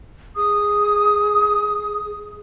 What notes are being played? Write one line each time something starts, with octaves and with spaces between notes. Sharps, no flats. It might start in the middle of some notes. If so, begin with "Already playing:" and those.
G#4 D#6